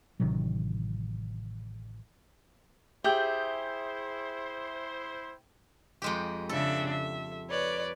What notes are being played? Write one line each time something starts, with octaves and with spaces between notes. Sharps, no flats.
A1 C3 D#3 F#3
E4 G4 G#4 C5 E5 G6
F2 G#3 G4
C#3 D4 A4 E5
E5
B4 C#5 D5